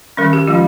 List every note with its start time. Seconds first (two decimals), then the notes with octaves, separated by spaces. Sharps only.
0.17 D#3 G3 C#4 A#4
0.33 G4
0.47 F3 G#3 C#4 F4